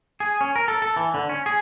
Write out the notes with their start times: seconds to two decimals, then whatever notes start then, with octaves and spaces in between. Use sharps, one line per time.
0.20 G#4
0.41 C#4
0.56 A#4
0.68 A4
0.82 A4
0.96 E3
1.14 D3
1.29 C#4
1.46 G#4